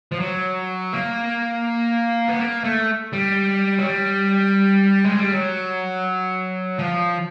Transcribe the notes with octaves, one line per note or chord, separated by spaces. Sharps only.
F3
F#3
A#3
B3
A#3
A3
G3
F#3
G3
G#3
G3
F#3
F3